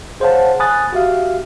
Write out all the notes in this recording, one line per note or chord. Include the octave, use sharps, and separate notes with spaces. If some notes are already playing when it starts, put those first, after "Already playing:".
G#4 C5 C#5 F5 F#5 A5
G#5 B5 D#6 F#6 A6
F#4 G4 E5 F5